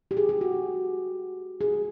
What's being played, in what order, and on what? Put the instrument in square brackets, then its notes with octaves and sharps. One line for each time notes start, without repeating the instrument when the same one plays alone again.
[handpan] G4
G#4
G4
F#4
G#4